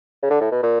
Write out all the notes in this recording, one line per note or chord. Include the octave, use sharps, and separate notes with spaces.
C#3
D3
A2
B2
A#2